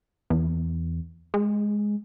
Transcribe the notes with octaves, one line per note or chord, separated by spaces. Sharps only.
E2
G#3